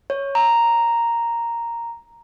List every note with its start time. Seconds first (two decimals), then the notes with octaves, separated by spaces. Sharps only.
0.10 C#5
0.35 A#5